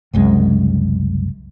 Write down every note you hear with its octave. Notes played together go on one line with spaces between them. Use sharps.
F#1 C2 F#2 G#3